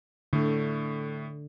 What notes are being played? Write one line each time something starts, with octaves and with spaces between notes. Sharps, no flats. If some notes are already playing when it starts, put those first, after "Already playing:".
A2 D3 A3